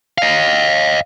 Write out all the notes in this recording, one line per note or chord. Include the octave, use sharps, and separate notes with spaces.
D#5 F5